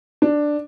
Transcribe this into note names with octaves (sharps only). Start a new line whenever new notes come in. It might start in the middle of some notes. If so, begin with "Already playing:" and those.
D4